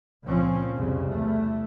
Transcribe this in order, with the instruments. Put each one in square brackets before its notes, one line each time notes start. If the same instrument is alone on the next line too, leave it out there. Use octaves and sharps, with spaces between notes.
[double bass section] C#2 A#2 F3 C4 C#4
C2 F2 C#3
E2 A3